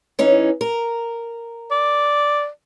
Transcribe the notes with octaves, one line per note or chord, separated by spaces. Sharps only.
E3 C#4 D#4
A#4
D5